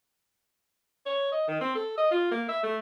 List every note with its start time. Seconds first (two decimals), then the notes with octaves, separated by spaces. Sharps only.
1.06 C#5
1.32 D#5
1.48 D#3
1.61 C4
1.75 A4
1.98 D#5
2.11 F4
2.31 A#3
2.48 E5
2.63 A3